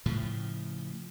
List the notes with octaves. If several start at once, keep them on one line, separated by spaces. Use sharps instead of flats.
A2 C#3 F3